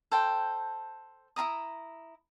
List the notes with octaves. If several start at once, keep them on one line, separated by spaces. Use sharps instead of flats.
A4 C5 G5
E4 F4 A#5 D#6